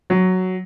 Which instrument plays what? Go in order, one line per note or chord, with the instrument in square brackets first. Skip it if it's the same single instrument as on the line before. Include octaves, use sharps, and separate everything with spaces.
[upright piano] F#3